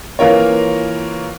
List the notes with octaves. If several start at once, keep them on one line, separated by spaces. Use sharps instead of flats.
E3 A#3 F4 A#4 C#5